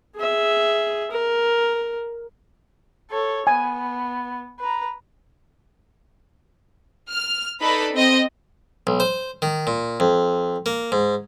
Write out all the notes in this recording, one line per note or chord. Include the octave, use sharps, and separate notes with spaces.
G#4 E5
A#4
A4 C#5
B3 G#5
B4 A#5
F6
D#4 A4 B4 D5 B5
C4 D#5
B1
C5
D#3
A#2
F2
A#3
G#2